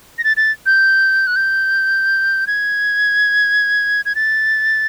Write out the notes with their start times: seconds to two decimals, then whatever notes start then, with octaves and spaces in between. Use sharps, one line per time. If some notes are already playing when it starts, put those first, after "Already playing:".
0.18 A#6
0.24 A6
0.37 A6
0.66 G6
1.27 F#6
1.36 G6
2.47 G#6
4.05 G#6
4.15 A6